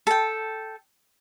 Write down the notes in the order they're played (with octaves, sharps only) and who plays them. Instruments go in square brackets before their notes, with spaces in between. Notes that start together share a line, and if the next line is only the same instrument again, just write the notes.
[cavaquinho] A4 G5